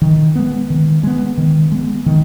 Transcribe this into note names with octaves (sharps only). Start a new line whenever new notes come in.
D#3
G#3 B3
D#3
G#3 B3
D#3
G#3 B3
D#3